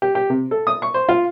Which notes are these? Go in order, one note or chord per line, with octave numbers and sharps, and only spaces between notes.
G4
G4
C3
A4
D#6
C#6
C5
F4